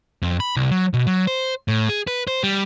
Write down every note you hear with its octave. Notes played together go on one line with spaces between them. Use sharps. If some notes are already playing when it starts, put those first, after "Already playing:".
F2
B5
C2
F#3
B2
F#3
C5
A2
G#4
B4
C5
G3